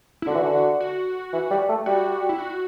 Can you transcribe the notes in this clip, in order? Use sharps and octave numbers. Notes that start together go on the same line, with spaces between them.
E4
D3 F#4
E3
D3
F#4
E3
G3
A3
G3 F#4
E4
F#4